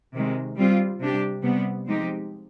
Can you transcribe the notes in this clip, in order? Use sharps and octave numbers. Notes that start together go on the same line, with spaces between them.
C3 D#3 G#3
G3 C4 F4
C3 G3 D4 G4
C3 G3 B3
F3 G#3 C4 D#4 G4